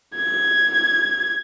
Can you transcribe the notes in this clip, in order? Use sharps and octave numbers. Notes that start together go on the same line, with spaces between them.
G#6